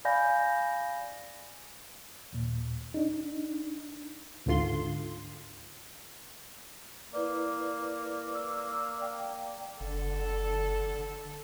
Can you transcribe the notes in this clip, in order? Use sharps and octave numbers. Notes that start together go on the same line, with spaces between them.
D5 F5 G#5 B5 G6 A#6
D#2 A#2
D4 D#4
G#1 D2 G#2 D3 F4 C6
A#3 E4 B4 D5
D5 E6
D5 F5 G5
F#1 D3 A4